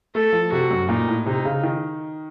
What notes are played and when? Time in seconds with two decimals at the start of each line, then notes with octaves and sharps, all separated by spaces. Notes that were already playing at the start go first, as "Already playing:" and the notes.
0.14 A3 A4
0.33 F3
0.52 C3 F#4
0.70 F#2
0.89 A#2 D#4
1.08 A2
1.26 C3 D#4
1.45 C#3
1.63 D#3